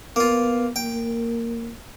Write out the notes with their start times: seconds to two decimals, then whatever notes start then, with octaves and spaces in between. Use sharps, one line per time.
0.16 A#3 B3 F4
0.76 A#3 G5